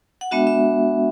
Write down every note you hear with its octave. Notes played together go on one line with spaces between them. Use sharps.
F#5
G#3 B3 D4 F#4 E5
E5